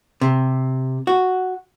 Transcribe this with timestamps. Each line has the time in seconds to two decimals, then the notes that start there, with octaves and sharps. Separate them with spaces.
0.21 C3
1.07 F#4